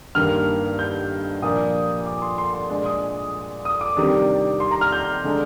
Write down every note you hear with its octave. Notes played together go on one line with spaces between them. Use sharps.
G2 D#3 A#3 F6
G6
A#2 F3 A#3 D4 D#6
D6
C6
C6
C6
A#2 G#3 D4
D#6
D#6
D6
C3 D#3 G3 D4
C6
A#5
F6
G6
D3 G#3 D4